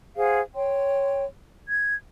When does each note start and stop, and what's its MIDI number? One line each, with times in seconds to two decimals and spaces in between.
0.17 0.40 68
0.17 0.40 72
0.17 0.40 77
0.17 0.40 78
0.55 1.22 73
0.55 1.22 79
0.55 1.22 84
1.67 1.95 92